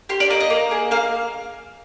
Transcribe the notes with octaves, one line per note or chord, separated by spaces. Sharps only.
G4 C6
D5
A#3 D#5
D#5
A#3
G#4
A#3 F5